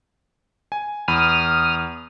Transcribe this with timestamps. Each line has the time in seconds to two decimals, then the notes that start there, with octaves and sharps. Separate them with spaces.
0.72 G#5
1.08 E2 B5 D#6 F6